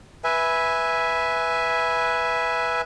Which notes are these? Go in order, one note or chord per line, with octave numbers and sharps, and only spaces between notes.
B4 E5 G#5